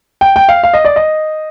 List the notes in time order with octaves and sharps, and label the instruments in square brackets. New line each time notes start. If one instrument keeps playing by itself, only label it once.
[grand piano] G5
G5
F5
F5
D#5
D5
D#5